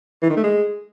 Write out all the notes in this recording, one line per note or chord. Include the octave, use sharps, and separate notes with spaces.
E3
D#3
A3
G#3